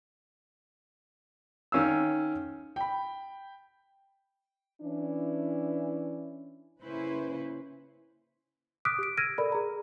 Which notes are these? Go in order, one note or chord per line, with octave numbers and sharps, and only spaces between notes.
D#3 C#4 F5 E6
G5 B5
E3 C#4 D4 E4
C#3 A#3 C#4 E4 B4 C5
D6 D#6 F6 F#6 B6 D7
G4 D7
E6 F6 G#6 A#6 D7 D#7
A4 A#4 D5 B5
G#4 A#5